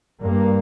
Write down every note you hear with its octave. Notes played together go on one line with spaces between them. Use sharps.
G2 A#3